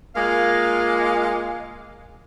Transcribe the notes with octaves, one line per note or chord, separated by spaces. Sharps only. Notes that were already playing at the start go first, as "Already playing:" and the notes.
G#3 A#3 F4 F5